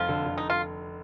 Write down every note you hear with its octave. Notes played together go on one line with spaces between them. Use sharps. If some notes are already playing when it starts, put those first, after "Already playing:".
Already playing: F1 F3 F4
D3
D3
D#4
F4